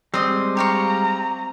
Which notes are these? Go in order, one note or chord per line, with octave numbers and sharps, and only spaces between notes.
G3 G#3 C4 D#5 C6
G4 F5 A#5 C#6